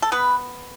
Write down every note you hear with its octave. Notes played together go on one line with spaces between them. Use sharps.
A4
B3 B4